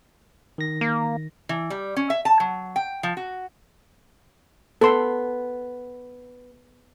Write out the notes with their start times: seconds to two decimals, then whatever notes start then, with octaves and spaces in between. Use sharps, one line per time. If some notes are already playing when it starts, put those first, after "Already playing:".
0.58 D#3 A#6
0.81 A#3
1.49 E3
1.70 G3
1.96 C#4
2.10 E5
2.25 A5
2.40 F#3
2.76 G5
3.03 F3
3.17 F#4
4.81 B3 A4 C6